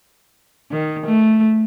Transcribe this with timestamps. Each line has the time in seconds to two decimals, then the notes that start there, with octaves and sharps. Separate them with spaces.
0.71 D#3
1.06 A3